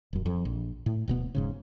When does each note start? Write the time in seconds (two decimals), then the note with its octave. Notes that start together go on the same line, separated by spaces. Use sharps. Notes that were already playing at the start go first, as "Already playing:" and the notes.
0.13 D#1 F#2
0.26 F2
0.45 A#1
0.86 A2
1.08 D1 B2 B3
1.35 E1 G#2 C#3